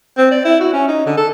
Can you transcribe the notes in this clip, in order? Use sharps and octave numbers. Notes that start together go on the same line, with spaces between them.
C4
D5
E4
F#4
C#4
D#4
D3
A4